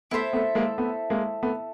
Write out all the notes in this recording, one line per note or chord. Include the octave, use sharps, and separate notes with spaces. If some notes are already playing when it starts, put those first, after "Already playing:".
A3 B3 E4 A4 C5 E5
A3 B3
G#3 A#3
A3 B3
G#3 A#3
A3 B3